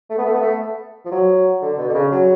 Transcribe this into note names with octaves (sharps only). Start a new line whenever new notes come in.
A3
B3
A3
B3
A3
F3
F#3
D3
B2
D3
C#3
F#3